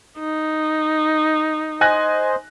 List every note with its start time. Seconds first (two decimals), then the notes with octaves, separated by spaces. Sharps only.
0.19 D#4
1.81 C5 D#5 G#5 F#6 A#6